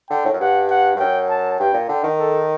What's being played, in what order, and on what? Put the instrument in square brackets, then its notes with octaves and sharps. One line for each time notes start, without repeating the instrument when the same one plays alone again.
[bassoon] D3 [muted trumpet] G5
[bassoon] A2
F#2
[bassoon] G2 [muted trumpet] F#5
[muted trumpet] F#5
[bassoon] G2
[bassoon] F#2 [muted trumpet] G5
[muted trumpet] A5
[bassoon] G2 [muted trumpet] G5
[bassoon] A#2
[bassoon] D3 [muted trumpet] G5
[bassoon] D#3
[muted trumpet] A4